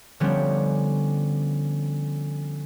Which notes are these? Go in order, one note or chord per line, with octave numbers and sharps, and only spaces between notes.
D3 F3 G3 B3 C#4 D4